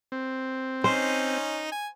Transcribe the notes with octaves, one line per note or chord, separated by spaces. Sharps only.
C4
C#4 D#4 C5
G#5